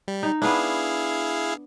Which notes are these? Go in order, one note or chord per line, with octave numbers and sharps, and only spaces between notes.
G3
D#4
B3 D4 E4 G#4 F5